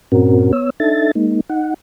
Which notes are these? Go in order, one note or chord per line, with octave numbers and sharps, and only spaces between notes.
G2 A#2 C4 C#4 F#4 A#4
B3 C#5 E6
D4 D#4 A4 E5 A6
G#3 A#3 D#4
D#4 F#5